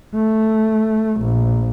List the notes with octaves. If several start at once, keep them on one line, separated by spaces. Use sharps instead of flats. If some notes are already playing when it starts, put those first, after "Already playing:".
A3
A#1